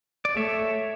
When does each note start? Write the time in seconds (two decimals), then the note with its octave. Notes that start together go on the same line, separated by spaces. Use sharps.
0.25 D5
0.36 A3 C#5 E5